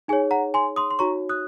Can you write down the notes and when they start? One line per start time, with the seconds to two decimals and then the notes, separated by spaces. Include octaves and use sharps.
0.08 D#4 G#4 C#5 G#5
0.31 F#5 A#5
0.54 G#5 C6
0.76 C6 D#6
0.91 C6
0.99 D#4 F#4 C#5 A#5 C#6
1.29 D#6 F#6